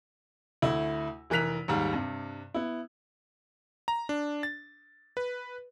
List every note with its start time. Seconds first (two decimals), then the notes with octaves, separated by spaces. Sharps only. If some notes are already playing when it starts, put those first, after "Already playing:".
0.62 D2 A3 E4
1.30 F1 E3 A#4 F#6 B6 F7
1.68 D#2 G#2 G3
1.93 G2 C3
2.54 B3 E4
3.88 A#5
4.09 D4
4.43 A6
5.17 B4